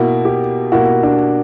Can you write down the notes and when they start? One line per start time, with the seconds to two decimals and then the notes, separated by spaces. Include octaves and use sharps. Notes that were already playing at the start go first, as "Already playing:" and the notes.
Already playing: B2 A#3 E4 F#4
0.25 G4
0.72 B2 A#3 E4 F#4
1.03 D4